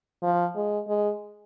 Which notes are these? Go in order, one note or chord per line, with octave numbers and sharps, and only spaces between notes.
F3
G#3
G#3